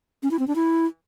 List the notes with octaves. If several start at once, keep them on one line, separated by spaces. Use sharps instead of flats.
C#4
E4
C4
D4
E4